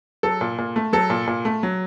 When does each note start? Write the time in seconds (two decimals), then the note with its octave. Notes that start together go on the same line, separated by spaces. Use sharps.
0.23 F#3 A4
0.41 A#2
0.58 A#2
0.76 A3
0.93 F#3 A4
1.10 A#2
1.27 A#2
1.45 A3
1.63 F#3